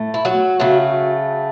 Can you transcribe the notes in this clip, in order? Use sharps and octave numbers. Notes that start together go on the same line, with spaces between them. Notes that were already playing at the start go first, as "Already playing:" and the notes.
Already playing: A2 A3
E4
F#3 F#4
C#3 F#3 A3